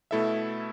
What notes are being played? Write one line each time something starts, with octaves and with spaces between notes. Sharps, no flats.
B2 A3 E4 A4 E5